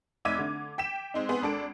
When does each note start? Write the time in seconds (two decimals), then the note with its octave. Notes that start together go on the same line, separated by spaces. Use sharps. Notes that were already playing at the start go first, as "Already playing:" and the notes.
0.25 F1 D#4 E5 D6 G#6 D#7
0.38 D3
0.78 G5 B6 E7
1.14 G#3 C4 D#4
1.29 B3 C4 G#4
1.42 G#1 D4 A4 D7